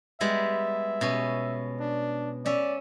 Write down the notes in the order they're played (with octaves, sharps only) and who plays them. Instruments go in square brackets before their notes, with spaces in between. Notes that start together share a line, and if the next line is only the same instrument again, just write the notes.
[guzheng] G3 G#3 B3 [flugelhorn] E5
[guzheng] B2 C#4
[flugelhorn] D4
[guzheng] C#4 E5 [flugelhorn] D5